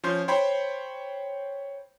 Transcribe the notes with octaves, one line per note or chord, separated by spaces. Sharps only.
F3 C#4 C6 G6
C5 C#5 G5 B5 C6